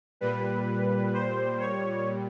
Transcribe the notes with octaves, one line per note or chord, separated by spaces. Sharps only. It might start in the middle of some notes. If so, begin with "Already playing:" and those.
A#2 G3 B4
C5
C#5